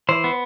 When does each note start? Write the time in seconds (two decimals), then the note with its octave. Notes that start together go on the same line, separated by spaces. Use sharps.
0.09 E3 C5
0.24 B3